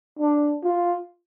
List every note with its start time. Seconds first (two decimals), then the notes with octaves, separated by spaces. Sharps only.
0.19 D4
0.64 F4